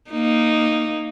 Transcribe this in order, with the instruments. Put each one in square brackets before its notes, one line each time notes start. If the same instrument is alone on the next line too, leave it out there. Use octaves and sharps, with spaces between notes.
[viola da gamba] A#3 D#4